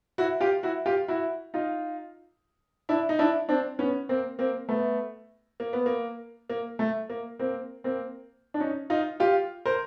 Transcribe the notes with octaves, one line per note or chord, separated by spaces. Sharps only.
E4 F#4
F4 G4
E4 F#4
F4 G4
E4 F#4
D#4 F4
D4 E4
D#4
D4 E4
C4 D4
B3 C#4
A#3 C4
A#3 C4
A3 B3
A#3
B3
A#3
A#3
A3
A#3
A#3 C4
A#3 C4
D4
C#4 D#4
D#4 F4
F4 G4
A#4 C5